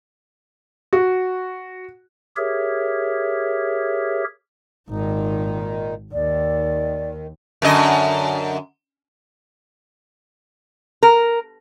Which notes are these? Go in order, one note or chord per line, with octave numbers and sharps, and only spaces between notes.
F#4
G4 G#4 A#4 C#5 E5
G#1 A#2 D#3 D#4
D#2 D#3 D5
F#2 D3 D#5
A#4